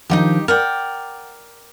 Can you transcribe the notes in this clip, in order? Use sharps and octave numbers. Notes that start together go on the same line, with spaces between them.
D#3 F3 D4 D#4 F#4 G4
A#4 D5 F#5 G5